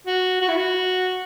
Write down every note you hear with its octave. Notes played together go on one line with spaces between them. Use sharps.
F#4
F#4
E4
F#4